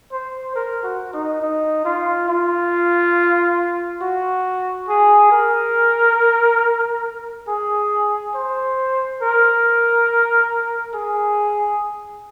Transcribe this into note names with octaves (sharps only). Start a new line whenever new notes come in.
C5
A#4
F#4
D#4
D#4
F4
F4
F#4
G#4
A#4
G#4
C5
A#4
G#4